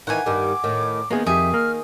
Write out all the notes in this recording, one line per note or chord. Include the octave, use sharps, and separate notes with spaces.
D#3 E3 D#4 F#5 G#5
G2 D#3 D6
A2 D#3
D#3 A#3 B3 G#4
F2 G4 G#4 E5
A#3 F6